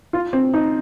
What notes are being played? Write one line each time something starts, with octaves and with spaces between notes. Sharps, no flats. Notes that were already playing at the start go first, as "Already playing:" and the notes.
F4
C4
D#4